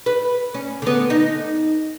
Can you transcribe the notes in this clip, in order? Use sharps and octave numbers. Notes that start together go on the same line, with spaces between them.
B4
C#4
D3 B3
D#4